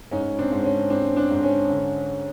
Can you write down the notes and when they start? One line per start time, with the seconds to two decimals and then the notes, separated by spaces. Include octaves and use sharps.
0.11 G#2 C#4 D#4
0.39 C4 D4
0.52 G#2
0.64 C#4
0.90 G#2 C4 D4
1.16 C4 D4
1.31 G#2
1.43 C#4
1.70 D3